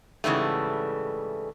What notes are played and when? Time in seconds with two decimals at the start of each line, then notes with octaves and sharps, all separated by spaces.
0.24 G#2 C#3 E3 G3 A3